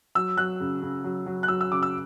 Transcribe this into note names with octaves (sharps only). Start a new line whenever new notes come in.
F#3 E6
F#3 F#6
C#3
C#3
F#3
F#3
F#6
F#3 E6
E6
C#3 D6
E6